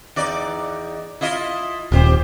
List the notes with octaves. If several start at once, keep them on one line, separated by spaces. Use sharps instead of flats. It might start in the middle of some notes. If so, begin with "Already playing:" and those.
E2 D#4 D5
E4 F4 D#5
D#1 C4 G4 C5